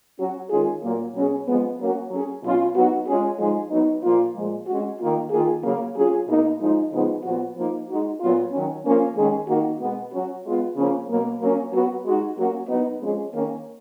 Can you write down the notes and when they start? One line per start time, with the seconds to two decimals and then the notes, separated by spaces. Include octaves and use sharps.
0.19 F#3 C#4 F#4
0.50 D#3 G#3 C#4 F4 G#4
0.83 A#2 F#3 A#3
1.14 B2 F#3 C#4 G#4
1.47 F3 G#3 B3
1.79 F#3 A#3 C#4 F#4
2.10 F#3 C#4 G#4
2.43 B2 F#3 C#4 F4
2.75 F#3 B3 D#4 F#4
3.08 G#3 C#4 F4 G#4
3.39 F3 G#3 D#4 G#4
3.71 F#3 B3 D#4
4.04 A#2 F3 A#3 F4
4.36 A#2 F3 G#3
4.67 G#3 C#4 F#4
4.99 D#3 A#3 F4
5.31 D#3 A#3 F4 G#4
5.63 C#3 F#3 A#3
5.95 F#3 C#4 F4 G#4
6.27 B2 A#3 D#4
6.59 F3 G#3 D#4
6.92 C#3 F3 G#3 B3 D#4
7.24 A#2 F3 B3 F#4
7.56 F3 A#3 D#4
7.88 G#3 D#4 F#4
8.21 A#2 F#3 B3 F4
8.52 D#3 F#3 C#4
8.85 F3 A#3 C#4
9.16 D#3 G#3 C#4 G#4
9.48 D#3 A#3 D#4 F#4
9.80 B2 G#3 B3
10.13 F#3 C#4 F#4
10.44 G#3 B3 F4
10.76 C#3 F3 A#3 C#4
11.09 B2 F#3 A#3
11.41 F#3 A#3 C#4
11.73 F#3 B3 F#4
12.05 G#3 D#4 F#4
12.37 F#3 A#3 C#4 F#4
12.69 F#3 B3 D#4
13.01 F3 G#3 C#4 G#4
13.34 D#3 A#3 C#4